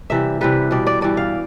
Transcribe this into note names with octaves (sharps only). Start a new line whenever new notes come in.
C3 E3 G3 E5
C3 E3 G3 B4
B2 G3 D5
D5
G2 E3 G3 D5
F5